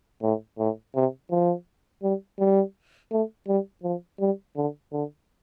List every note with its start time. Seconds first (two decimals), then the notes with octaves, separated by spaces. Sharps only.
0.22 A2
0.59 A2
0.95 C3
1.31 F3
2.03 G3
2.39 G3
3.11 A3
3.48 G3
3.83 F3
4.20 G3
4.56 D3
4.92 D3